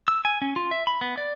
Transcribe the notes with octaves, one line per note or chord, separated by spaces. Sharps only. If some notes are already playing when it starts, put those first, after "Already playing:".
E6
G#5
C#4
F4
E5
B5
B3
D5